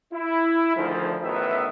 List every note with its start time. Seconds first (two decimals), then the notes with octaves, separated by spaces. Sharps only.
0.13 E4
0.75 D2 G#2 D3 D#3 F3
1.23 A1 D#3 B3 B4 E5